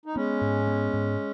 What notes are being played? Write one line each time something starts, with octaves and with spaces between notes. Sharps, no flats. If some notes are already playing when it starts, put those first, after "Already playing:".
D#4
G#3 B3 C#4
G#2
B3
G#2